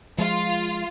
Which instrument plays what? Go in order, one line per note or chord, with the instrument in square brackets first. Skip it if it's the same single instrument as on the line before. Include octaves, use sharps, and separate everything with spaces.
[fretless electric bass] F3 G#3 [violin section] F4